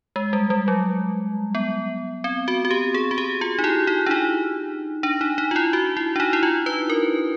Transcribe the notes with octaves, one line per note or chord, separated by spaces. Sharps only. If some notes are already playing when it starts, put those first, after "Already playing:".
G#3
G3
G3
F#3
B3
C4
F#4
F#4
G4
G#4
F#4
G4
F4
D#4
E4
D#4
D4
D#4
D4
D#4
D#4
F4
E4
F#4
E4
D4
D#4
E4
F4
B4
A#4